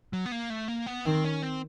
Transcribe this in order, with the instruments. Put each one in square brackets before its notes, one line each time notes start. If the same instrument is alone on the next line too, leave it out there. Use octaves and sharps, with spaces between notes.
[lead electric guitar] F#3
B3
A#3
A3
A#3
B3
[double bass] D#3 [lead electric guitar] C4
[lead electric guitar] C#4
C4